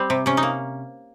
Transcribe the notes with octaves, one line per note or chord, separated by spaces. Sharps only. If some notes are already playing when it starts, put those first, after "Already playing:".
Already playing: G3 C4
C3
C3 C#4
D#4
A#3